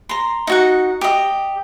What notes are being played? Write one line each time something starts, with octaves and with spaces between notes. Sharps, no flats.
A#5 C6
D#4 F#4 F#5
G4 D#5